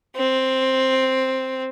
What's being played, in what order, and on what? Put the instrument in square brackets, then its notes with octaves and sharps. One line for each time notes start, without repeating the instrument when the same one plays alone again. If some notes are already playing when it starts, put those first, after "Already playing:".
[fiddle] C4